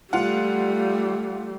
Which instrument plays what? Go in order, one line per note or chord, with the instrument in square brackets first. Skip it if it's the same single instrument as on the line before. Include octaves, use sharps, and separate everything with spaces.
[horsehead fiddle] G3 A3 [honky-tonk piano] F4 F#5